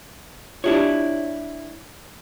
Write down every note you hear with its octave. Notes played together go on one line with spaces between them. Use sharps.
D4 E4 F4 G4 C#5